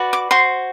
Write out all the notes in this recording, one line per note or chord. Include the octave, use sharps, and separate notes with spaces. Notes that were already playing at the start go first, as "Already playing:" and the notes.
Already playing: F#4 B4 D5
D6
F#4 C5 C6